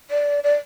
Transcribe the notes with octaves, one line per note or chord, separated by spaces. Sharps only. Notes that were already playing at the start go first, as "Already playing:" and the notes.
D5
D5